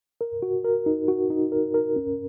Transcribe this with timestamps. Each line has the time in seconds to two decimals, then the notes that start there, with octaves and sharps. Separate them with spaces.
0.21 A#4
0.42 F#4
0.64 A#4
0.86 D#4
1.08 F#4
1.30 D#4
1.52 A#4
1.74 A#4
1.96 C#4